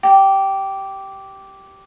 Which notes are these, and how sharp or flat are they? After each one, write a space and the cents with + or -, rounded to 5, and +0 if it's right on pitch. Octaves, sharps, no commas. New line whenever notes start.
G4 -10